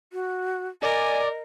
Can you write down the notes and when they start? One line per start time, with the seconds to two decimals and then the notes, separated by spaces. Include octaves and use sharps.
0.13 F#4
0.83 A#4 D5 D#5 G#5